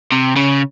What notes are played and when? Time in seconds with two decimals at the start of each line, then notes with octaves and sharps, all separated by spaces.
0.12 C3
0.36 C#3